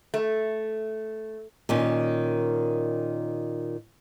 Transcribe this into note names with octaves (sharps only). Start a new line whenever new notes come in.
A3
A#2 D#3 C#4